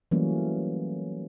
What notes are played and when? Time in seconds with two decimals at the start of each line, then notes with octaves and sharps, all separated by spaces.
0.11 E3 F#3 G3 A3 A#3 C#4